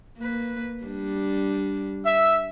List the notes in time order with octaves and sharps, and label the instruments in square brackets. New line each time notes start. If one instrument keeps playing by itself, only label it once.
[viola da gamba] A#3 B4
G3 D4
[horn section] E5